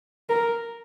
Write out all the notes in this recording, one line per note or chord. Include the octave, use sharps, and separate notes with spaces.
A#4